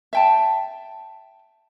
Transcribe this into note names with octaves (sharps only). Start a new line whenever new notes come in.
E5 G5 A5